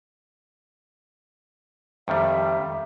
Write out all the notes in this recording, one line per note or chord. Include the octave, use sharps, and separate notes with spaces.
F2 D#3 G3 E5